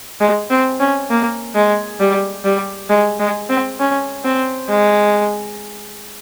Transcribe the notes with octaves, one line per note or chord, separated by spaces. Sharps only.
G#3
C4
C#4
A#3
G#3
G3
G3
G#3
G#3
C4
C#4
C4
G#3